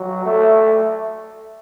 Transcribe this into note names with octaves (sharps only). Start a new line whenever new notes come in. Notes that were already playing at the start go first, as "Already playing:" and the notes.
Already playing: F#3
A3